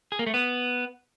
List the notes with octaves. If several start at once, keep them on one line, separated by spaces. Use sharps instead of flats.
G#4
A#3
A3
B3